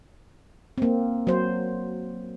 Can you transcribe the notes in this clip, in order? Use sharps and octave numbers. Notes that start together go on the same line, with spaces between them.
A#3 C4
F#3 C5